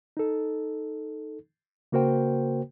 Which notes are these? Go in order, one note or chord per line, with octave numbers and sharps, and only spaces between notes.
D#4 A4
C#3 A#3 F#4 A#4 C5 G5